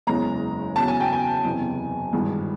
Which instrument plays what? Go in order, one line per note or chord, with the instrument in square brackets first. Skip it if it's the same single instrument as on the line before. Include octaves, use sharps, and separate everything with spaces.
[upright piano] F#1 E2 C#3 E3 G#3 A#5
E2 C#3 F#3 A5
G#5
G5
G#5
F#1 E2 C3 E3
G#1 G2 E3 G#3